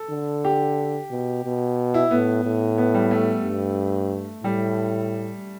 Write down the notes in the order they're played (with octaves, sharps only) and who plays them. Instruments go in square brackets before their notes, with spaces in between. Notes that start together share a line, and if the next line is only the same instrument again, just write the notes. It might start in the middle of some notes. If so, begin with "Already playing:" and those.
Already playing: [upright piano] A4
[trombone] D3
[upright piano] G4
[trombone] B2
B2
[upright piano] E4
[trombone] A2 [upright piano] B3
[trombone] A2
[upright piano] B3
G3
A3
[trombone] G2
[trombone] A2 [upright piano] G3